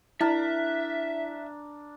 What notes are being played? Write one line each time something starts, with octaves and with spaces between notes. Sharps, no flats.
D4 E4 A#4 E5